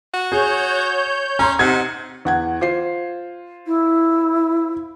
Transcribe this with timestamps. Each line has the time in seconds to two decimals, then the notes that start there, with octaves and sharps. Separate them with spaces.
0.14 F#4
0.32 G#4 C#5 G6
1.39 C#4 A#5 C6
1.59 C3 D#4 F#5 G#6
2.25 E2 F#5 G#6
2.61 F4 C5 C7
3.66 E4